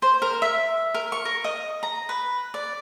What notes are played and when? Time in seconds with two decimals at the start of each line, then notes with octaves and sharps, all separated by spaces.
0.02 C5
0.22 A#4
0.42 E5
0.94 A#4
1.12 C#6
1.25 A#4
1.44 D#5
1.83 A#5
2.09 B4
2.54 D5